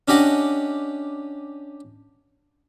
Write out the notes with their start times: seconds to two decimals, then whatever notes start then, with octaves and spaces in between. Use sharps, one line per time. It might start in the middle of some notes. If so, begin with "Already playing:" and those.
0.08 C#4 D4 G4 D#5 F#5